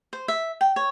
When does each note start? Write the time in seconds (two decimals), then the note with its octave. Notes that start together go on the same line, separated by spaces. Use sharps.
0.13 C5
0.28 E5
0.61 G5
0.76 C#5